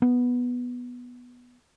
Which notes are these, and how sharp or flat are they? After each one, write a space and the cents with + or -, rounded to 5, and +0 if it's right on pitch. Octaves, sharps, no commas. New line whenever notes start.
B3 -5